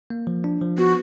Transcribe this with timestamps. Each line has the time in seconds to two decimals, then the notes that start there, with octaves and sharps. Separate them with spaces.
0.10 A#3
0.27 F3
0.44 D4
0.61 F3
0.78 B3 F#4